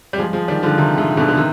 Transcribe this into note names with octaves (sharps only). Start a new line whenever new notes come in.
G3
F3 G#3
F3 G#3
D#3 G3
D3 F3
C3 D#3
G#2 C3
B2 D3
D3
C3 D#3